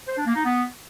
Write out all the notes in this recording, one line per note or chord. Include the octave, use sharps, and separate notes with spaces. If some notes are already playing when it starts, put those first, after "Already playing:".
C5
D4
A#3
D#4
B3